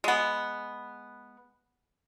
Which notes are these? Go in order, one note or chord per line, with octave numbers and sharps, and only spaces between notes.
G#3 B3